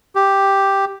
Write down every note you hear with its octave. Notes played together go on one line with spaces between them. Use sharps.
G4